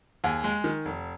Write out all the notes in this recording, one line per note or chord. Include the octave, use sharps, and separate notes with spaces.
D#2 G#4
G#3
D#3
F1